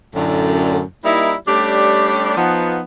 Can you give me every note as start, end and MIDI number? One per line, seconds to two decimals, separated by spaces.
0.15 0.82 42
0.15 0.82 45
0.15 0.82 50
1.05 1.34 55
1.05 1.34 58
1.05 1.34 63
1.05 1.34 64
1.48 2.37 55
1.48 2.37 57
1.48 2.37 61
1.48 2.37 62
1.48 2.37 67
1.48 2.37 74
2.37 2.81 53
2.37 2.81 59
2.37 2.81 63